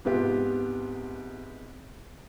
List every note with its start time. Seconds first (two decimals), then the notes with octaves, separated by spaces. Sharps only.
0.05 G#2 C3 B3 F4 G4